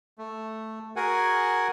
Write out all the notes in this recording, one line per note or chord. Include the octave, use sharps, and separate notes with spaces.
A3
F#4 G#4 A#4 F#5 G#5